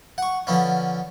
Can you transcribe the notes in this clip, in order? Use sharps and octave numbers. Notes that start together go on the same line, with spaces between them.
F#5 C#6
D3 F3 B3 C#4